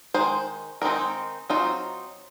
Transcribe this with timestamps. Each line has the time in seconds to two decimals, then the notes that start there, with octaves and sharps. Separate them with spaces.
0.14 D#3 G#3 C5
0.82 D#3 G#3 C4 D#4 A#4
1.50 F#3 C4 D#4 F4